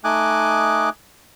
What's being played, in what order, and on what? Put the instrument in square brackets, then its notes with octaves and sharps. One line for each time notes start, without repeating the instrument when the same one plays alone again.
[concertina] A3 D#4 D#5 G#5 D6 F#6